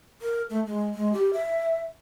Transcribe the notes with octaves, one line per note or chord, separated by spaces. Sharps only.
A#4
A3
G#3
G#3
G4
E5